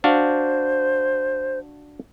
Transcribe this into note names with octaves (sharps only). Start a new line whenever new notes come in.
D4 F#4 C5 F5